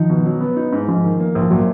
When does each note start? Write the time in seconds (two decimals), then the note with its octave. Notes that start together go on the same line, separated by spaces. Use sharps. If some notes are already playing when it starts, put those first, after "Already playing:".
Already playing: D#3 F3 D#4
0.10 B2
0.25 F#3
0.41 B3
0.56 D#4
0.72 G#2
0.88 G#2 F3
1.04 D#3
1.20 A#3
1.35 A#1
1.42 F3
1.51 A#2 F#3